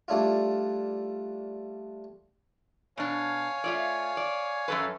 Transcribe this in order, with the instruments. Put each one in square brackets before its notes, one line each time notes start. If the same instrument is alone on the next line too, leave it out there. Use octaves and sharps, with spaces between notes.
[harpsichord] G3 A3 D4 E4 F4
[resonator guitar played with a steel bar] B2 D4 [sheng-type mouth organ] C#5 F5 G#5
[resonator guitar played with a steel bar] A3 F4 D5
D5
F#2 A4 B4